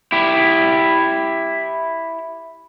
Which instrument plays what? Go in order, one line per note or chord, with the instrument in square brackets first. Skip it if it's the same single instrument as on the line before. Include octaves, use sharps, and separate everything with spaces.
[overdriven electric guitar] E4 G4